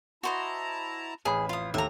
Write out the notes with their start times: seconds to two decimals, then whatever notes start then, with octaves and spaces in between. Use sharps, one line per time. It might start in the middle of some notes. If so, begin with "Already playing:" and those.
0.23 E4 F#4 C5 D#5 A5 A#5
1.25 A1 F2 G#4 B5
1.49 F4 D#6
1.74 D#2 A3 E5 A#5